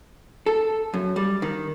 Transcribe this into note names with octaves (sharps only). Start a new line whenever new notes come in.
A4
F#2
G3
D#3